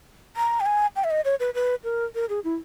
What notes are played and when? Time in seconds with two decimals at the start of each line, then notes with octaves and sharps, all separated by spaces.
0.36 A#5
0.60 G5
0.66 G#5
0.96 G5
1.04 E5
1.11 D#5
1.25 C#5
1.40 B4
1.55 B4
1.84 A#4
2.15 A#4
2.29 G#4
2.44 E4